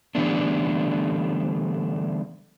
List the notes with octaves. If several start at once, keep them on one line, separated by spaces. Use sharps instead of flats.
D3 E3 G3 A3 B3 D4